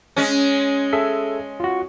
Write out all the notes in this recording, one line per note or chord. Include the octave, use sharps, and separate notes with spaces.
G#3 C#4
G#4 A4 E5
F4 F#4